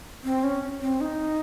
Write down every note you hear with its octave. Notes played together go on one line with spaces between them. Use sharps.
C4
C#4
C4
D#4